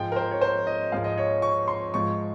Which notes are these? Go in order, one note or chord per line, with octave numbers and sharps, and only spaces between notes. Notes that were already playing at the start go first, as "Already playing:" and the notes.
Already playing: G#2 F3 G#3 G5
A#4
C5
C#5
C5
D#5
G#2 F3 G#3 F5
D#5
C#5
C#6
C6
G#2 F3 G#3 C#6